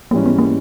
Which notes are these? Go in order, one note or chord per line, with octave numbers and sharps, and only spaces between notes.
G#2 E3 G3 A#3 C#4
B3
A#3